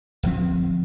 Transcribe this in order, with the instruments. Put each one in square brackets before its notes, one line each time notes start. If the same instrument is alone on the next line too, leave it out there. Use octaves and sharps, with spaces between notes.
[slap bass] D1 G1 F3 C4